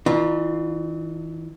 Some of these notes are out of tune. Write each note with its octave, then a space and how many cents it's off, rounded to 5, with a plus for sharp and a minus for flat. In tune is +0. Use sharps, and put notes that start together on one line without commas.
E3 -35 D4 +40 F4 +0